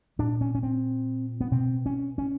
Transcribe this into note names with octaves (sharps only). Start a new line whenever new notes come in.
A#2 D4
C#4
C#4
C4
B3
B2 C4
C#4
C#4